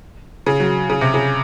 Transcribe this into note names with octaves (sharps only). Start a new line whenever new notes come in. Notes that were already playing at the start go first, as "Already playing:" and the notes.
C#3
F#3
C#3
C3
C#3